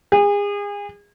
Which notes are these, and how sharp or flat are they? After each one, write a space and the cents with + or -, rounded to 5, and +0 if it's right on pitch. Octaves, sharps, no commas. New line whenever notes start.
G#4 -35